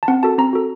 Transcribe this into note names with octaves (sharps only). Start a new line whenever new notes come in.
A5
C4 F#5
F#4 A4 A5
C4 A#5
F#4 A4